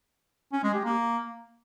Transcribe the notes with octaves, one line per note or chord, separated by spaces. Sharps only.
C#4
G#3
G4
A#3